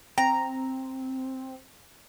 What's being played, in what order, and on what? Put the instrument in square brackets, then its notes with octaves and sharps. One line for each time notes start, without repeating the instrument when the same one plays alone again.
[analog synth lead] C4 [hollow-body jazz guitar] G5 [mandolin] A#5